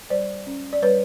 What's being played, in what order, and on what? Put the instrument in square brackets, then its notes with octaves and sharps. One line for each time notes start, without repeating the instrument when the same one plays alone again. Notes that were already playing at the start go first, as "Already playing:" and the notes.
[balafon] G3 C5 D5
C#4
D5
G3 B4 C#5